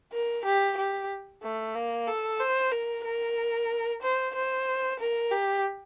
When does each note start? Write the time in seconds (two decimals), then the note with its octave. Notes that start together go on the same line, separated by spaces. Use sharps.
0.12 A#4
0.45 G4
0.77 G4
1.43 A3
1.75 A#3
2.08 A4
2.40 C5
2.72 A#4
3.05 A#4
4.02 C5
4.35 C5
4.99 A#4
5.32 G4